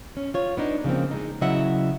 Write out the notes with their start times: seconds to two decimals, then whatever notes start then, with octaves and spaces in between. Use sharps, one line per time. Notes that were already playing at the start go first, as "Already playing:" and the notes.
0.17 C#4
0.34 F4 C#5
0.57 B3 D4 D#4
0.84 C#3 F3 A#3 C4
1.11 G#3 D#4
1.41 C#3 F#3 E4 D#5 E5 F#5